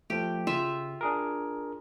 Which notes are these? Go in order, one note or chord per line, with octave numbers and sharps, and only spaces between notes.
F3 A3 G4
C#3 F4 E5
D4 G#4 A#4